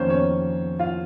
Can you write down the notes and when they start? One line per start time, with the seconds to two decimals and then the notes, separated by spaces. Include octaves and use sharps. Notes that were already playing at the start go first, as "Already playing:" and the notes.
Already playing: F2 D#3 A#3 C#4 C5 C#5
0.10 C#4 C#5
0.79 F4 F5